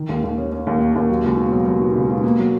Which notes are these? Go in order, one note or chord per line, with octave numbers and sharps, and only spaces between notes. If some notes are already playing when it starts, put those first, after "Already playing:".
Already playing: D#3
D#2
D#2
C#4
C#4
D#2
A#3
D#2
F#3
C#2
B2
F#3
F#3
B2
C#2
B2
A#3
F#3